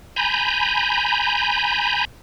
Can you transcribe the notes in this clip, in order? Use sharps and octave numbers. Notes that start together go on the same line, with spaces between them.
G#5 A#5 B5 G6